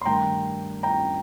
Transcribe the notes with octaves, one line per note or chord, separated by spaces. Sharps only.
C6
G2 D#3 A3 G5 A#5
G5 A#5